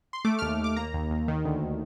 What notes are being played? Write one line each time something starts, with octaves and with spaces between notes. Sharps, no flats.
C6
A3 D6
D#2 F6
D#2 D6
A#3 A#5
D#2
D#2
D#3
D2